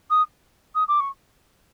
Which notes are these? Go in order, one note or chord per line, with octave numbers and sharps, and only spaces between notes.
D#6
D#6
D6
C#6